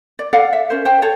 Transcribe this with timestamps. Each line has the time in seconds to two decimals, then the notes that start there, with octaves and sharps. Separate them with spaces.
0.19 D5
0.33 A4 D5 F5 F#5
0.53 E5
0.70 C#4 A#4 C5
0.85 C5 G5
1.02 A4 C5 C#5